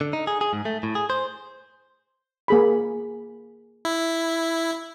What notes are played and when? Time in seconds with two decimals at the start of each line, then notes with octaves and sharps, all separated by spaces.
0.01 D3
0.13 D#4
0.27 G#4
0.41 G#4
0.53 G#2
0.65 A3
0.83 A2
0.95 G#4
1.10 C5
2.48 A#3 G#4 B5
3.85 E4